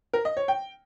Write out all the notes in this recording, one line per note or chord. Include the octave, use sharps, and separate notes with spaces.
A#4
D#5
C#5
G5